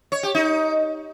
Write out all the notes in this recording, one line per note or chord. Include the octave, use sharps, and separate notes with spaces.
C#5
G4
D#4